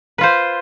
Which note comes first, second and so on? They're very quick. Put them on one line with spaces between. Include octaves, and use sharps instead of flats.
B4 F4 C5